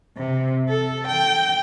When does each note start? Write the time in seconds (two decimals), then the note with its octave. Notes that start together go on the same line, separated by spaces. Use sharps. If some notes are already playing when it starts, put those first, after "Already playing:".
0.17 C3
0.69 A4
1.08 G5